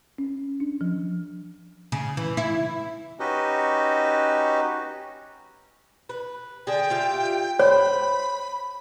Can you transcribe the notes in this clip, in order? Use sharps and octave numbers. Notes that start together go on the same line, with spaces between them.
C#4
D4
F3
C#3
E3
E4
C#4 D#4 F#4 G4 B4 D#5
B4
D3 G#4 G5 A5
F4 G4 E5
C5 C#5 B5